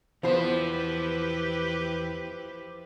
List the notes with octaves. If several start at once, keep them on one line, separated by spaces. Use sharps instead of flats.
E2 F3 B3 E4 G4 B4 C5